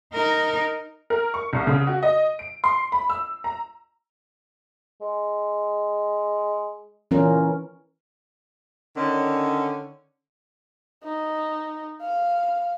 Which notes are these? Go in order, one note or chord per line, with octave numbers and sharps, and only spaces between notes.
D#4 A#4
A#4
C#6
C2
C#3
F#4
D#5
D7
C6
B5
E6
A#5
G#3
A#2 E3 C#4 A#4
D3 D#3 C#4
D#4
F5